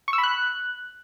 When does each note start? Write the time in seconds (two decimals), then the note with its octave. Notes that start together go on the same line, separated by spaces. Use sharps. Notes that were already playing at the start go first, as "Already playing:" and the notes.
0.08 C#6
0.13 E6
0.18 B5
0.23 F#6